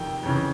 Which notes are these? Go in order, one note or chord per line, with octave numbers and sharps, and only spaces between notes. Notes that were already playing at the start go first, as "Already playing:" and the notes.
Already playing: F2 C3 D#3 G5
F2 C#3 E3